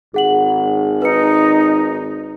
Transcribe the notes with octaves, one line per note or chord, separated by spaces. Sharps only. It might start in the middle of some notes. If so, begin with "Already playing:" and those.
G#1 G#4 F#5 F#7
D#4 B4 C#7